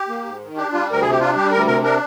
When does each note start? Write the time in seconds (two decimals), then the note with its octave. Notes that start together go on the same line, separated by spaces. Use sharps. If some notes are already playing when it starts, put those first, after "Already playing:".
Already playing: G4
0.09 A#3
0.25 G#2
0.40 D#3
0.56 D4 G4
0.73 G3 F4
0.88 D2 A#4
1.01 C3 G#4
1.10 G4
1.20 D4 F4
1.36 G3 G4
1.51 D2 A#4
1.67 C3 A#4
1.83 D4 A#4